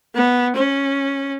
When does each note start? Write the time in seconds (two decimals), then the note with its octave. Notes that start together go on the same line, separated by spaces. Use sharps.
0.15 B3
0.56 C#4